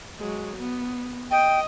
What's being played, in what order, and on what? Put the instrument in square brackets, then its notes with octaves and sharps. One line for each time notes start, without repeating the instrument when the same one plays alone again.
[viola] F#3 G#3
B3
[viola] D#5 [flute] G5